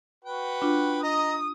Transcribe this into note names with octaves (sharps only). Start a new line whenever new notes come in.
F#4 B4 G5
D4 F4
D#5 A#5 D#6